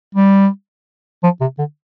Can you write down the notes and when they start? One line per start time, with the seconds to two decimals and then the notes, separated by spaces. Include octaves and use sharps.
0.15 G3
1.23 F3
1.41 C3
1.58 D3